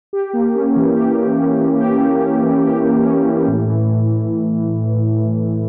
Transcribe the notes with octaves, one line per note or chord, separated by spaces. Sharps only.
G4
A#3
C#4
E3
G4
A#3
C#4
E3
G4
A#3
C#4
E3
G4
A#3
C#4
E3
A2
E3